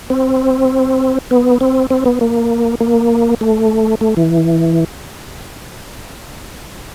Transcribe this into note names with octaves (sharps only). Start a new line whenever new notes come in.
C4
B3
C4
C4
B3
A#3
A#3
A3
A3
E3